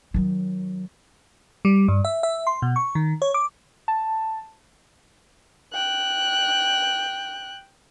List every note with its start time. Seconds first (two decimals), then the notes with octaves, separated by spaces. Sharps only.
0.14 D#3 F#3
1.65 G3
1.88 G2
2.05 E5
2.23 E5
2.47 C6
2.62 B2
2.76 C#6
2.95 D#3
3.22 C#5
3.34 D6
3.88 A5
5.73 G5 F#6